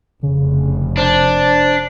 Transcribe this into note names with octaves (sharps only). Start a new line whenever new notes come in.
F1 C#3
D4 C5